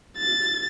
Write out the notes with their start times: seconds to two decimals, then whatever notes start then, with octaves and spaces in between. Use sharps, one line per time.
0.18 A6